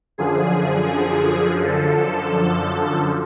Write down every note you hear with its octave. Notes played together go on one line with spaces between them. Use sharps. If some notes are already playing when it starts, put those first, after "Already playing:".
F#2 D3 F3 G#4
A4